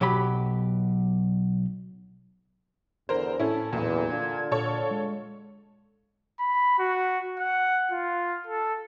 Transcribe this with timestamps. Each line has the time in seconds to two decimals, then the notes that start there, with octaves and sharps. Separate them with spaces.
0.01 B1 F#3 G4 B5
3.09 E2 D3 A#4 C5 C6
3.40 A2 C#4 E4 A4
3.73 B1 E2 A#2
4.09 D3 D4 F4 G#6
4.52 A#2 A4 C#5
4.91 G#3
6.40 B5
6.79 F#4
7.39 F#5
7.91 F4
8.47 A4